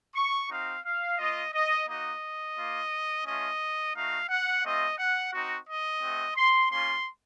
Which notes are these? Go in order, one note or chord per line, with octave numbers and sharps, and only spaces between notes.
C#6
C4 D#4 F#4 F5
F5
A#3 F4 D#5
D#5
A#3 D#4 F#4 D#5
A#3 F4
A3 C#4 F4 D#5
A3 D#4 F#4 F5
F#5
A3 C4 F4 D#5
F#5
C4 D#4 F#4
D#5
A3 C4 F#4
C6
A#3 C#4 F4 C6